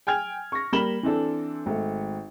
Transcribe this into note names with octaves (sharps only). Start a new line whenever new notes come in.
G5 G#5 F6 G#6 F7
C#6 A#6
G3 A#3 B5 E7 F#7 G7
E3 C4 D4 A4
G#1 A3